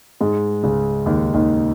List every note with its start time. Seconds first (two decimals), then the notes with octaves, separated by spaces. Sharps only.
0.21 G#2 G#3
0.63 C#2 C#3
1.06 D#2 D#3
1.34 D#2 D#3